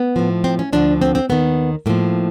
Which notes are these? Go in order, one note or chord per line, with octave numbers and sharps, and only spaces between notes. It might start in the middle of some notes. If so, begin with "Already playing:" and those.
Already playing: B3
A2 F3
C4
C#4
D2 D3 F3 D4
C4
C4
D#2 D#3 B3
A2 F3 A#3